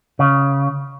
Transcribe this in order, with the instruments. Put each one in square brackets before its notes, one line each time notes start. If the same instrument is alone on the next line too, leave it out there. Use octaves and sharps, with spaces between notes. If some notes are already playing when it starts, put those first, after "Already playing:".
[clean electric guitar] C#3